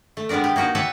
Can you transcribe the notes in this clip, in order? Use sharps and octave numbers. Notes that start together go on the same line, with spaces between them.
A3
G3 G#3 B3 D4 A#4
G4
A#3 D#4 F#4 G4
G4 B4 C#5 E5 G5 A5